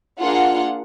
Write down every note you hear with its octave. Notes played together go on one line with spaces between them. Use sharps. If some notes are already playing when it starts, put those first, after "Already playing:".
A#3 D4 F4 G#4 F#5